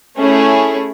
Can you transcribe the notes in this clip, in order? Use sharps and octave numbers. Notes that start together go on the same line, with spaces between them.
A3 C#4 E4 G#4